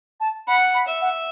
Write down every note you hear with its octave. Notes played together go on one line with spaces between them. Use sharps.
A5
F#5 B5
B5
E5
F#5